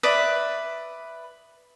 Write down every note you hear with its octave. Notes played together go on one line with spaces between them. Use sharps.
B4 D5 E5 D#6